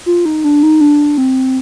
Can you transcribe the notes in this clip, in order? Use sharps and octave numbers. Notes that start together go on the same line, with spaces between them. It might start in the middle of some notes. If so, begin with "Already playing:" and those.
F4
D#4
D4
D#4
D4
C4